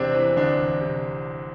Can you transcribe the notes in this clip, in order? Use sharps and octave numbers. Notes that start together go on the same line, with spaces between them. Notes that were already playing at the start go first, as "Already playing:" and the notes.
Already playing: E1 C3 C4 D4
E3
D2 D4
E1
C3